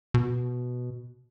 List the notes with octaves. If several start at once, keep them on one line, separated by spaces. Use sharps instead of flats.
B2